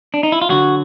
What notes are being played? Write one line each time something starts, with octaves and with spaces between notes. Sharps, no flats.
D4
D#4
E4
F4
D3 F#3 F#4